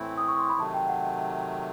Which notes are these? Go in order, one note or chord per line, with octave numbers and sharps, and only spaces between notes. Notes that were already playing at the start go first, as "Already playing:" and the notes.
Already playing: A2 E3 A3 C4 E4
D#6
C#6
C6
B5
C3 D#3 F#3 A3 A5
G5
F#5